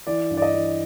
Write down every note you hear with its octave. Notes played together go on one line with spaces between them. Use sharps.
E3 D5
G2
D5
D#5
E3